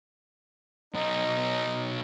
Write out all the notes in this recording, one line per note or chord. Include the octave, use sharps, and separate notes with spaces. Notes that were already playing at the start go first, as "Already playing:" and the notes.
B1 D#4